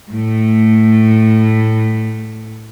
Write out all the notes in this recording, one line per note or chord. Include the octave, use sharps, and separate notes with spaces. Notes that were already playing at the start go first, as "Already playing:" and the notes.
A2 A3